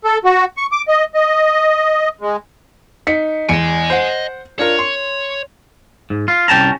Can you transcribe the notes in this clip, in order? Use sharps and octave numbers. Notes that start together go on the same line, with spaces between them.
A4
F#4
C#6
D6
D#5
D#5
G#3
D#4 B6 C#7
E2 D#5 G#5 C#7 D7
C5 F#5
D4 F4 A#4 C#5
C6
G#2
F4
C2 C#4 G5 A5 A#5